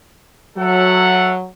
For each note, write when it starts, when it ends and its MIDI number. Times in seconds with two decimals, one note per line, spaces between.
0.57 1.47 54
0.57 1.33 69
0.57 1.33 76
0.57 1.33 78